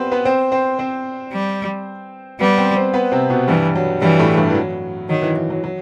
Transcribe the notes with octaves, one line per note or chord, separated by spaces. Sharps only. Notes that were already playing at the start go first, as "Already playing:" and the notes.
Already playing: G3 B3 C4 G4 B4 C5
B3 B4
C4 C5
C4 C5
C4 C5
G3
G3 B3 B4
C4 C5
C4 C5
B3 B4
C3 C4
B2 B3
G2 E3 G3
F#3
G2 E3 G3
A2 A3
G2 G3
E3
F#3
D#3 F#3
E3
E3
F#3
F#3